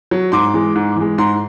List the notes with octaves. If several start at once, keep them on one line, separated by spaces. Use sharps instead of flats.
F#3
G#2 C6 D6
E3 G#3
G#2
E3
G#3
G#2 A#5 C6